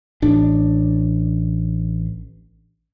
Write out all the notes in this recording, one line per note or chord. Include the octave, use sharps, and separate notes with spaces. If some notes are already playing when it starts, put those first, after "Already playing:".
A1 D4